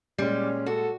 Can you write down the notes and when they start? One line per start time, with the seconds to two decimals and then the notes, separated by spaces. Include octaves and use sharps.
0.18 A#2 G3 G#3 C#4
0.66 F#4 A4